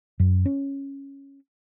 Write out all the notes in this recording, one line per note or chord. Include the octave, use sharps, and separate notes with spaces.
F#2
C#4